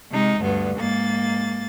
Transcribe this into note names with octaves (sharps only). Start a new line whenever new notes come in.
C3 G#3 D#4
D2 G2 B3
G#2 A#3 A6